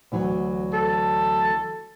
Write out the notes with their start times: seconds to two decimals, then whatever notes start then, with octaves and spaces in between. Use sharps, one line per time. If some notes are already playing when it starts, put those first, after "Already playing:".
0.12 D2 E3 F#3
0.73 A4